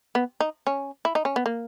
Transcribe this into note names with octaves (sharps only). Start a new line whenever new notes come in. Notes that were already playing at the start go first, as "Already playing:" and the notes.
B3
D#4
C#4
E4
D#4
C#4
B3
A#3